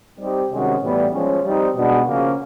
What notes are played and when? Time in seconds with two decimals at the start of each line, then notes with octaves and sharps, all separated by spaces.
0.18 G3 C4 D#4 G4
0.49 C3 D#3 G#3 C#4 F#4
0.81 A2 E3 G3 B3 E4
1.13 F3 G#3 C#4
1.43 G3 C4 D#4
1.75 B2 G#3 B3 D4 F#4
2.06 C#3 F3 A#3 C#4